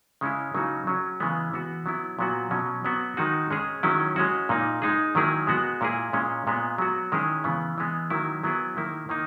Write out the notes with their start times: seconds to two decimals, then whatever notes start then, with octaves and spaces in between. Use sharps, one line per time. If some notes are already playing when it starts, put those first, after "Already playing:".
0.21 C#3 G#3 C#4 E4
0.55 C#3 F#3 A#3 D#4 F#4
0.87 F#3 C#4 G#4
1.20 C#3 E3 G#3 B3
1.53 E3 B3 F#4
1.86 F#3 B3 E4
2.19 A#2 F#3 B3 F#4
2.51 B2 F#3 C#4
2.85 F#3 B3 F#4
3.17 D#3 G#3 D#4 F#4
3.51 G#3 C#4 G#4
3.83 D#3 F#3 C#4 E4
4.16 G#3 C#4 F#4
4.49 A#2 A#3 D#4
4.82 G#3 D#4 G#4
5.15 D#3 F#3 A#3 E4 G#4
5.47 G#3 B3 F#4
5.81 A#2 A#3 E4 G#4
6.13 A#2 G#3 C#4
6.47 A#2 G#3 B3
6.78 F#3 B3 F#4
7.12 D#3 G#3 C#4 E4 G#4
7.44 C#3 E3 B3
7.78 E3 G#3 B3
8.10 D#3 F#3 A#3 E4
8.44 F#3 B3 E4 G#4
8.77 D#3 A#3 E4
9.09 D#3 A#3 D#4